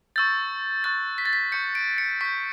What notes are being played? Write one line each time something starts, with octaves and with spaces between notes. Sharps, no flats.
C#6 E6 G6 A6
C#6 F#6 A6
B6
A6
B6
C#6 G6 C#7
D7
C#7
C#6 G6 B6